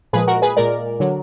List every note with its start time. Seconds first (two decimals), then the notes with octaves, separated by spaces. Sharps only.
0.13 A#2 F3 G#3 G#4 B4
0.27 F#4 A#4
0.42 G#4 B4
0.57 A#2 G#3 A#4 D5
1.00 D3 F#3